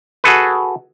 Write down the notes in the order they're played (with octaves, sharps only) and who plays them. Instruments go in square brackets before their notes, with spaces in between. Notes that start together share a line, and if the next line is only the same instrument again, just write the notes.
[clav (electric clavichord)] F#4 G#4 A4 B4